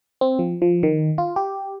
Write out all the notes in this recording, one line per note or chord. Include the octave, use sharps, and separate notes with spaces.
C4
F3
F3
D#3
F4
G4